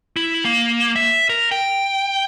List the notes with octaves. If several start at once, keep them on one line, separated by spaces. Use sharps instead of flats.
E4
A#3
E5
A#4
G5